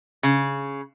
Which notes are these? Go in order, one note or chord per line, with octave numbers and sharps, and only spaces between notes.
C#3